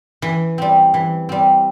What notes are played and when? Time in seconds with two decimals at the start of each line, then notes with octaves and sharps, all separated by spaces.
0.22 E3
0.58 G3 C4
0.94 E3
1.29 G3 C4